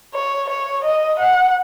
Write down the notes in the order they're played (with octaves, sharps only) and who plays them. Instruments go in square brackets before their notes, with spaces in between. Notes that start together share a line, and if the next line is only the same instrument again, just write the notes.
[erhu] C#5
C#5
D#5
F#5